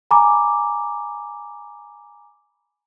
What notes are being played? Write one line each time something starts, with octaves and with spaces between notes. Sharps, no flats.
G#5 A#5 B5 D6